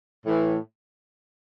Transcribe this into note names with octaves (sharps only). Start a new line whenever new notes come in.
A2 E3